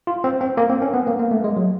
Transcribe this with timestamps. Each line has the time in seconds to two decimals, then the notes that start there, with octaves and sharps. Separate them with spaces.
0.07 F4
0.24 C4
0.41 C4
0.57 A#3
0.70 C4
0.82 C#4
0.94 B3
1.07 A#3
1.19 A#3
1.31 A3
1.44 G#3
1.57 F#3